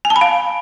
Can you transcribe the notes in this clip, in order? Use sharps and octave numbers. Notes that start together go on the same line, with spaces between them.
G#5
A5
B5
F5